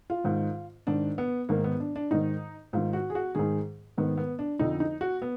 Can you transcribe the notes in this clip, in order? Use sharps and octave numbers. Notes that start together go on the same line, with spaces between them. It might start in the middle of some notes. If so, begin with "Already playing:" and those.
F4
G#2 D#3
G#2 D#3 D4
B3
G#2 D#3 A#3
B3
D4
D4
G#2 D#3 D#4
G#2 D#3 F4
F#4
G#4
F#4
G#2 D#3 G#4
G#2 D#3 B3
B3
D4
F2 D3 F3 D#4
D#4
F#4
B3